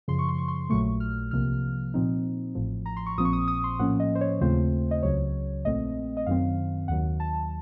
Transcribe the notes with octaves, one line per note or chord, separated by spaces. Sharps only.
F#2 C#3 F3 C6
C#6
C6
C#6
C6
A#1 A#2 F#3 A3 C#6
F6
C2 C3 F3 A#3 F6
A#2 F3 C4 D#4
A1 A2 F3
A#5
C6
C#6
A#1 A#2 F3 C4 D#6
C#6
D#6
D#6
C6
A2 F3 A#3 C#4 F#5
D#5
C5
C#5
D#2 C#3 A3 C4 F4 C5
D#5
C#2 C#3 F#3 C#5
A#1 A#2 A3 C4 D#5
D#5
F#2 D#3 F#3 C4 F5
D#2 D#3 F#3 F#5
A5